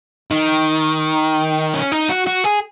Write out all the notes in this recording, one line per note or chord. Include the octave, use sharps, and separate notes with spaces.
D#3
C#4
D#4
F#4
F#4
G#4